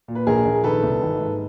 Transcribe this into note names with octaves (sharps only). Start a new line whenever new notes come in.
A#2
B4
A#1 G#4 A#4
A#1
D#3 A4 B4
C2
G#1
G#2